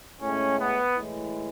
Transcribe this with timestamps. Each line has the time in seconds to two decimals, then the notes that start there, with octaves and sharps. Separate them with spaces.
0.20 A2 G#3 C#4
0.58 B3
0.95 A2 E3 G#3